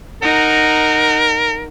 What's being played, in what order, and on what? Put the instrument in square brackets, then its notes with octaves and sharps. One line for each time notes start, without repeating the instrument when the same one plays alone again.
[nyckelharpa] D#4 F#5 [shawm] A#4